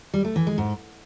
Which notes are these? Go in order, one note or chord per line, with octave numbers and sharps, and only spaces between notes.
G3
A3
E3
G#3
G#2